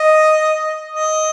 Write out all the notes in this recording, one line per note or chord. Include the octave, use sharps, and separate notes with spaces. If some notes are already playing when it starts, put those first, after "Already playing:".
Already playing: D#5
D#5